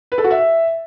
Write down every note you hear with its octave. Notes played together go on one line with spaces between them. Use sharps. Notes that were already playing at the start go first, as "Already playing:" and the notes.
B4
A4
F#4
E5